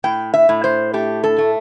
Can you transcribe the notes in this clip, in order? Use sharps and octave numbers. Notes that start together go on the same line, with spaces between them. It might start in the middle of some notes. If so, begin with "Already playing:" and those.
A2 G5
E5
A2
C5
A3 G4
A4
A3